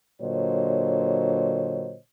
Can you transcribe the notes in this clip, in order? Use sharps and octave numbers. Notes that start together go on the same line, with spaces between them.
A#2 D3 F#3 C5 C#5 D#5